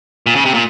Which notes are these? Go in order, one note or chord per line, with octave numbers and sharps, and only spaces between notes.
A#2
C#3
C3
A#2